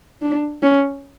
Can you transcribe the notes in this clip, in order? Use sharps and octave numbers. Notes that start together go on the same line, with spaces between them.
D4
C#4